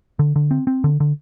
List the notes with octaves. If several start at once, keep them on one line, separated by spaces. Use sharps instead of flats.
D3
D3
C4
C4
D3
D3